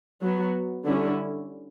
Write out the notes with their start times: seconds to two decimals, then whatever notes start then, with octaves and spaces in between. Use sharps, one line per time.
0.21 F#3 B3 F#4
0.86 D3 G3 C#4 E4